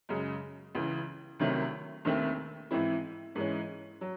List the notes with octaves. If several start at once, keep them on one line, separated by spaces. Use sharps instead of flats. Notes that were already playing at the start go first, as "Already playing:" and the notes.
F#2 C#3 G#3
C#2 C#3 E3
C2 C3 D#3 F#3 A3
E1 D#2 D#3 A3 C4
G#2 E3 C4 E4
G#2 E3 G#3 C#4
F#3